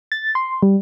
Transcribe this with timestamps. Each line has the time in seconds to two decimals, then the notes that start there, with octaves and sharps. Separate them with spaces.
0.12 A6
0.35 C6
0.63 G3